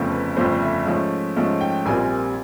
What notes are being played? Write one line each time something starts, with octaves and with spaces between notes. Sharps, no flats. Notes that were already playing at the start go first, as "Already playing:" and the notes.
Already playing: G1 F2 C#3 F3 A3
B4
G1 F2 C#3 F3 A3 C5
E5
G#2 F3 A3 C#4
G#2 F3 A3 C#4
G5
A#1 A#2 G3 C4 G#5